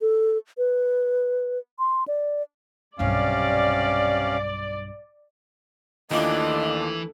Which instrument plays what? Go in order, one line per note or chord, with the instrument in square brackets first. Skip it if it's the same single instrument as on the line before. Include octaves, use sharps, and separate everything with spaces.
[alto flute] A4
B4
C6
D5
[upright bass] B1 G2 [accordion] C3 C#4 F5 [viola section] D5
[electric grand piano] D#2 F4 D6 [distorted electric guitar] E3 [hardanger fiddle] A3 D4 [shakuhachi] D#5